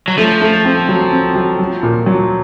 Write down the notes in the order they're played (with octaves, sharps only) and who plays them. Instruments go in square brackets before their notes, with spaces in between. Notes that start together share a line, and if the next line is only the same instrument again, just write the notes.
[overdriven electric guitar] F#3
[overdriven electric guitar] F3 [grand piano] A3
[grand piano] A3
C4
F#3
C4
F#3
F#3
A#2
F#3